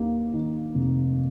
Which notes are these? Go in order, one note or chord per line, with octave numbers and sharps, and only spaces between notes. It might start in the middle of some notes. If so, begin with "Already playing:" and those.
Already playing: D#2 A#3
D#3
F1